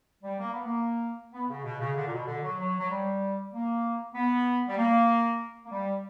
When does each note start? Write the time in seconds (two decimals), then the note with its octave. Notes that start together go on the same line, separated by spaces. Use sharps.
0.24 G3
0.39 A#3
0.53 B3
0.66 A#3
1.33 B3
1.49 C#3
1.64 B2
1.80 C#3
1.96 D3
2.06 A#2
2.12 B2
2.27 D3
2.43 F#3
2.59 F#3
2.79 F#3
2.90 G3
3.52 A#3
4.15 B3
4.68 G3
4.78 A#3
5.65 A#3
5.71 G3